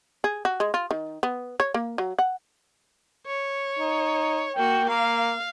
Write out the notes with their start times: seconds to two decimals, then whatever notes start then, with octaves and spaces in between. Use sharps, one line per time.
0.24 G#4
0.45 F#4
0.60 G#3
0.74 F4
0.91 D#3
1.23 B3
1.60 C#5
1.74 A#3
1.98 F#3
2.19 F#5
3.26 C#5
3.79 D#4
4.56 A#3 F#4 G5
4.89 A#3 F5